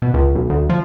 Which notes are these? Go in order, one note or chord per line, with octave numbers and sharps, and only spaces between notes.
B2
C#2
B1
D2
F3